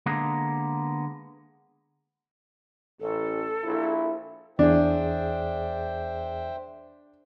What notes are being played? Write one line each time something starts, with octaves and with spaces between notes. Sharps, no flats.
D3 G#3 A#3 B3 A#4
A1 A4
A#1 E4
E2 D4 G#4 C5 E5 G5